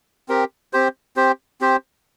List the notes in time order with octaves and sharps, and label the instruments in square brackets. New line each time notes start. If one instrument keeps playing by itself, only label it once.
[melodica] C4 G4 A#4
C4 G4 C5
C4 G4 C5
C4 G4 C5